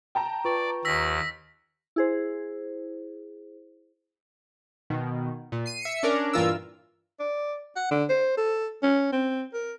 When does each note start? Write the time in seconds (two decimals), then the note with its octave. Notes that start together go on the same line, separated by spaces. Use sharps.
0.15 G5 A5 A#5
0.45 F4 B4 D5 C#6
0.85 D#2 E6 A#6 B6
1.96 E4 G#4 C5
4.90 B2 D#3
5.52 A#2
5.66 C7 D#7
5.82 E5 C#7
6.03 C#4 D4 A#4 D5
6.33 G2 A#2 E3 F4 A#4 E6
7.20 D5
7.76 F#5
7.91 D3
8.09 C5
8.37 A4
8.83 C#4
9.13 C4
9.54 A#4